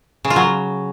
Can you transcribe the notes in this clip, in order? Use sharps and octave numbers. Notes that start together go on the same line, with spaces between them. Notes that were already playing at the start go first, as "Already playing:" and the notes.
C#3
F4
F#3